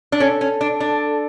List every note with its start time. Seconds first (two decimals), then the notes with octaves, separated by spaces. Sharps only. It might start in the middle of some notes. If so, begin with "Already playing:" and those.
0.12 D4
0.20 C#4 A4
0.41 C#4
0.61 D4
0.80 D4